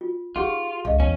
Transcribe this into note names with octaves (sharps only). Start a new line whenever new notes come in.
F4
D#4 F4 G4 G#4 F#5
C#2 D#5 F5
E2 C#4